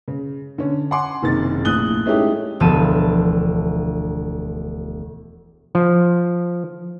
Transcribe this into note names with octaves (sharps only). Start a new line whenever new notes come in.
C#3
D3 C#4
F#5 G#5 C6 D6
F#1 C3 D#3 A6
A#1 A2 D#6 F#6 G7
G#3 A3 C#4 D#4 E4 G4
E1 D2 F3 B3 A5 D#7
F3